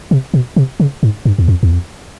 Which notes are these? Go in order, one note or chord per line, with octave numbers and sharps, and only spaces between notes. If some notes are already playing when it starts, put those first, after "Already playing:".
C3
B2
C3
C#3
G#2
G2
E2
F2
E2
F2